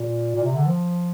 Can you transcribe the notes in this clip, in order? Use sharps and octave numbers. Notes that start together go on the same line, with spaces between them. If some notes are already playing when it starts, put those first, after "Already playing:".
Already playing: A#2
A#2
C3
D3
F3